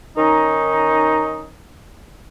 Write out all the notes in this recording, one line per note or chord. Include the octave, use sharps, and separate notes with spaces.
D#3 C#4 D#4